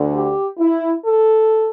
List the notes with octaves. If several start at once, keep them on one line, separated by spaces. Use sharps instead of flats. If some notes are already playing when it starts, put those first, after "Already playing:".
Already playing: D2 D3
G4
E4
A4